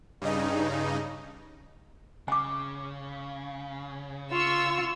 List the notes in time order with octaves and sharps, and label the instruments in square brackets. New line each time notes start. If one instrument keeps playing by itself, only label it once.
[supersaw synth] G2 C#3 D#4
[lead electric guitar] C#3 [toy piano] G#5 D6
[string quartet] F4 [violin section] C#6 E6